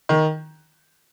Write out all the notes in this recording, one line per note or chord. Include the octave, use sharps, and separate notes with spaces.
D#3